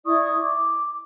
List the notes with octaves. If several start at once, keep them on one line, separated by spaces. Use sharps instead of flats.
E4 D5 C#6 D#6
D6